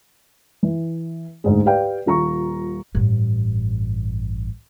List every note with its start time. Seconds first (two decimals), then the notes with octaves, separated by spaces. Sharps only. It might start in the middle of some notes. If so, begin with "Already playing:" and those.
0.63 E3
1.44 D2 G#2 G#3
1.66 G4 B4 D5 F5 G5
2.06 D#1 F4 A#5 C#6
2.95 A1 G2